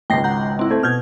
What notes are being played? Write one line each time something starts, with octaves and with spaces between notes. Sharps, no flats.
G#1 C#2 G5 A#6 C7
F#5 A#5 G6
C4 E4
A3 C5 G#6
B2 F6 G6 G#6